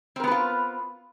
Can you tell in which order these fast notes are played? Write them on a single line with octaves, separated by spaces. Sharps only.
C4 A#4 B3 B4 F4